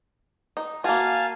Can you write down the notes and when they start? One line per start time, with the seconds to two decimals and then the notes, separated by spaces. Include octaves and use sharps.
0.57 D#4
0.84 A#3 F#4 F5 G#5 A5